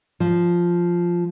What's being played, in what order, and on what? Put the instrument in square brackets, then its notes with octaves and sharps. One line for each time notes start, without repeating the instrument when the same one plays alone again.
[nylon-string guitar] F3